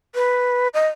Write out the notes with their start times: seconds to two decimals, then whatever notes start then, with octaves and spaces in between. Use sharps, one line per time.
0.15 B4
0.74 D#5